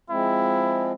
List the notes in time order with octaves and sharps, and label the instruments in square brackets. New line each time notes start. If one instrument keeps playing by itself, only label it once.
[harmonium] F3 G#3 C4 [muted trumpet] E4